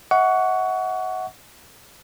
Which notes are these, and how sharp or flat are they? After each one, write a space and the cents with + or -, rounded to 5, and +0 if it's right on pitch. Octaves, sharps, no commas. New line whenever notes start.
D#5 +45 F#5 +0 C#6 +25